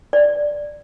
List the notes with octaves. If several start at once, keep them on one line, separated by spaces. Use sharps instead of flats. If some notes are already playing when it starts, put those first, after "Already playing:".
D5